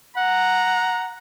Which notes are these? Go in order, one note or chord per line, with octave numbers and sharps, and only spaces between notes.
F#5 A#5